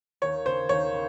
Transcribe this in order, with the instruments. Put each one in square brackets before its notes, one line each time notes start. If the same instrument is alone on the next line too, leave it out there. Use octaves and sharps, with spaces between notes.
[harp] D#2 [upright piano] C#5
[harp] C#3 [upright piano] C5
[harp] D#2 [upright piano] C#5
[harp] C#3